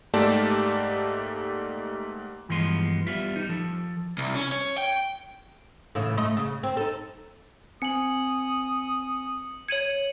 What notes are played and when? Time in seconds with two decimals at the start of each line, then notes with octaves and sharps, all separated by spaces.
0.14 G#2 A3 A#3 G4 D5 A5
2.49 G2 E3 F3 G#3 B3 C6
3.06 G3 B3 F4 E5
3.36 G3 D#4
3.49 F3 A4
4.18 C2
4.35 C#4
4.52 C#5
4.78 G5
5.95 A2 C#3 E3
6.17 A3 D#5
6.37 C#3
6.63 C4
6.77 D#4 A4
7.82 C4 G#5 D#6 C#7 F#7
9.68 C#5 G#6 C#7 D#7 F#7